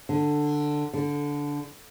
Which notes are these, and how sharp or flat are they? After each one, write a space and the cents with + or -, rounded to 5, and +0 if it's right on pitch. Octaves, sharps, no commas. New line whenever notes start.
D3 +10
D3 -15